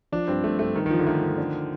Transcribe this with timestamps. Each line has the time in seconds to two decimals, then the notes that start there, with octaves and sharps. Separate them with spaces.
0.12 F3 D4
0.28 G2 C4
0.44 G2 A3
0.59 G2 A3
0.75 G2 D#3
0.86 D#3
0.90 G2 F3
0.99 D3
1.06 D#3 A3
1.22 G2
1.38 D4